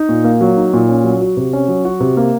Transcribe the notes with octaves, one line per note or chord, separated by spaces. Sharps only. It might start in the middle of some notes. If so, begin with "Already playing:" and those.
Already playing: D#4
A#2
A#3
F#3
D#4
A#2
C#4
F#3
F#4
C3
C#4
F#3
F#4
C3
A#3